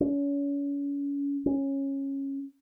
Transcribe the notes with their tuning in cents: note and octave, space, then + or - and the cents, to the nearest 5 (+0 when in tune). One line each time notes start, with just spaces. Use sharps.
C#4 +35
C#4 -15